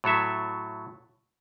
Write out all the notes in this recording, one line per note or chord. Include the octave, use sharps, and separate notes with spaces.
A2 F#3 A4 E5